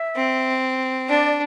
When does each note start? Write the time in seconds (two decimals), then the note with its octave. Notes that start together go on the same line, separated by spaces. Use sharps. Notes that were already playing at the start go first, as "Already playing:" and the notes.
Already playing: E5
0.16 C4
1.09 D4 D5